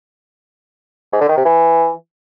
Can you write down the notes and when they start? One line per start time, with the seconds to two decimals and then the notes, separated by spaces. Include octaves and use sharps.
1.13 G#2
1.21 D3
1.29 D#3
1.37 C3
1.45 E3